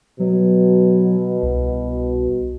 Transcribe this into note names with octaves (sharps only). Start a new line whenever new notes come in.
B2 F#3
C2